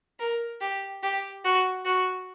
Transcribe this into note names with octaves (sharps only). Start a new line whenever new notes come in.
A#4
G4
G4
F#4
F#4